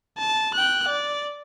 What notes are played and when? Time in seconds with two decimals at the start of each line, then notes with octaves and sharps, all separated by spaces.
0.18 A5
0.54 G5 F#6
0.88 D5